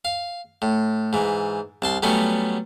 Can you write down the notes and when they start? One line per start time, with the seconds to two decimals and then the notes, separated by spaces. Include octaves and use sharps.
0.05 F5
0.62 A2
1.13 G#2 E3
1.82 C2 A5 C6
2.03 F#3 G3 A3 B3 C#4